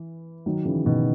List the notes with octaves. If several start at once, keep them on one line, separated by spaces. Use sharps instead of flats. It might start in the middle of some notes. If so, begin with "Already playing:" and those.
Already playing: E3
D#3 F#3
C#3 E3
B2 D#3